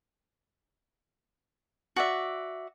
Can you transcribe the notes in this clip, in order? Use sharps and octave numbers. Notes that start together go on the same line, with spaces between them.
F#4 D5 E5